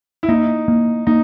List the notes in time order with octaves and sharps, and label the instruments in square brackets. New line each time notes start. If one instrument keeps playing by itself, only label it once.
[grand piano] E4
[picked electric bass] A#3 [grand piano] D#4
[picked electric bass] A#3
[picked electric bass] A#3 [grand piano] D#4